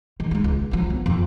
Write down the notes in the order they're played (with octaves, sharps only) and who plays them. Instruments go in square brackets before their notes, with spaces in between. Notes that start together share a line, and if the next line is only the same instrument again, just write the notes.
[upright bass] D#3
G#3 D#4
C#2
F2 F#3
B3
F2